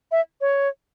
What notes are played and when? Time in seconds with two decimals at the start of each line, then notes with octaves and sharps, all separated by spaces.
0.12 E5
0.41 C#5